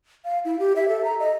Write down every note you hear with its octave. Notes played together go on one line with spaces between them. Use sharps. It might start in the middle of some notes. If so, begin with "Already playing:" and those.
F5
E4
G4
E5
A4
A#5
D#5